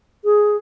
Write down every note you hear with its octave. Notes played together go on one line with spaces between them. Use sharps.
G#4